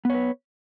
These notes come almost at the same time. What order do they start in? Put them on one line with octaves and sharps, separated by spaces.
B3 C#5 B4